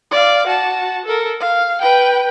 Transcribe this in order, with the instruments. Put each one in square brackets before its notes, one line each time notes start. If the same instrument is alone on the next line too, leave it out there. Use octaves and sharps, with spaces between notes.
[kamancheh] D5 F5
F#4 A5
A4 A#4
F5
B4 G5